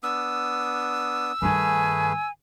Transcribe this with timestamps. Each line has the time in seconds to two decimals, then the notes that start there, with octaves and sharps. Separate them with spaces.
0.03 B3 D4 D#6 E6
1.42 G2 D#3 A3 G#4 B4 G#5